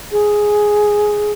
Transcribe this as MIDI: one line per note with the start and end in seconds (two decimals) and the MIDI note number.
0.12 1.32 68